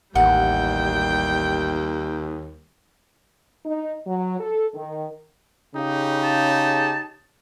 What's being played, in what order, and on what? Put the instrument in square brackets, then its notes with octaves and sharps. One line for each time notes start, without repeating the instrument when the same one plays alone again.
[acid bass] A1 [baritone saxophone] D#2 [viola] G3 G5 [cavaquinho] F#5
[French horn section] D#4
F#3
A4
D#3
[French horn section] C#3 [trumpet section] D#4 G4
[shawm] A5